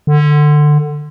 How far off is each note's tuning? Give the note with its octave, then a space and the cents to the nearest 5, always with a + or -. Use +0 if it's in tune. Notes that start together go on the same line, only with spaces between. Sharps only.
D3 +20